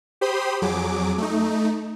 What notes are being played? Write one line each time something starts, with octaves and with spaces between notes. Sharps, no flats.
G4 C5 B5 C6 D#6
F2 F#3 G#4 D6
A3 D#4